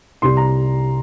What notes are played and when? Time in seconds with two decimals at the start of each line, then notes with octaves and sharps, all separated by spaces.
0.22 C2 C3 G3 C6
0.37 A#5